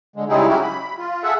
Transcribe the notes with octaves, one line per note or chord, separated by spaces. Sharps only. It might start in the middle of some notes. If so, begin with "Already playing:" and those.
D3 G#3
C#3 G3 G#3 D#4 E4 G#4
F#3 C#4 E4 F#4 G4
B5
F4
G#4 A4 E5 F#5